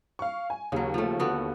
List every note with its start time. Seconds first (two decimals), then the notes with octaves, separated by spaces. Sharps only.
0.19 F5 C#6
0.50 G#5
0.72 D#2 C#3 F#3
0.94 F3 A3
1.19 D3 B3 F#4